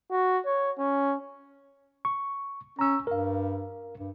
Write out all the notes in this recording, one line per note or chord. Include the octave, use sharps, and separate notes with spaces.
F#4
C#5
C#4
C#6
C#4 A#5 E6
G2 A#4 F5
G2